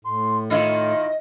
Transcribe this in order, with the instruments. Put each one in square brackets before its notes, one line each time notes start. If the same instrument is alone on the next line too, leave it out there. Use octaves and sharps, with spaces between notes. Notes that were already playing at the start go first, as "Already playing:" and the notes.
[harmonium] A2 [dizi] C6
[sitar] D#3 E4 F4 [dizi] D#5